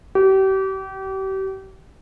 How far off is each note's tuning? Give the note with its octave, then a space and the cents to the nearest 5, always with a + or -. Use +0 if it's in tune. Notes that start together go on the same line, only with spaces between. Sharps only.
G4 -35